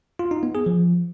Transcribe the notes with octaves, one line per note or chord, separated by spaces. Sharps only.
F4
D#4
B3
G#4
F3